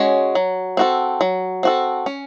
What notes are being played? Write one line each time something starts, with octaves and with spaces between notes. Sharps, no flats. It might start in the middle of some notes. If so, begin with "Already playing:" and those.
Already playing: G#3 C#4 F#4 C#5
F#3
C4 F#4 A4
F#3
C4 F#4 A4
C#4